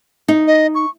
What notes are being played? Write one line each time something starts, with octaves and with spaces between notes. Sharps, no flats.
D#4
D#5
C#6